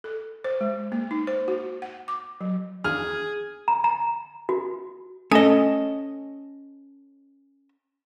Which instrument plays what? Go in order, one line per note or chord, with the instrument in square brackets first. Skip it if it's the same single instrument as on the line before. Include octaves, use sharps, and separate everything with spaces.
[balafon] A4
C5
G#3
A#3
D#4
C5
F#4
F#5
D6
F#3
[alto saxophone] G#4 [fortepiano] F6
[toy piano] A#5
A#5
F#4
[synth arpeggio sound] A3 G#5 D#6 [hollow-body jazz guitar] C#4 A4 D#5